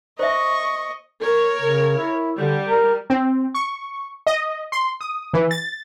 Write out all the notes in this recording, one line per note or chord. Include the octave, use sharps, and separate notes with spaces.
C5 D#5 E5 C#6
A#4 C#5
C#3
E4
D3 G3
A#4
C4
C#6
D#5
C6
D#6
E3
A6